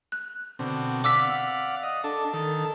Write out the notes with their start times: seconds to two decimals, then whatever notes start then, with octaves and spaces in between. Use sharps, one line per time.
0.12 F#6
0.59 B2 D3 C4
1.04 D5 F5 F#5 D6 E6 B6
1.83 D#5
2.04 D4 A4
2.33 D#3 A4